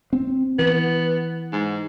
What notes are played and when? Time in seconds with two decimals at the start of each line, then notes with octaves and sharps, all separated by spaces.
0.13 C4
0.59 E3 B3
1.53 G#2